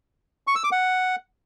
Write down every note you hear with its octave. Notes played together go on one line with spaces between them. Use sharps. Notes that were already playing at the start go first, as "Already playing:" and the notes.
C#6
E6
D6
F#5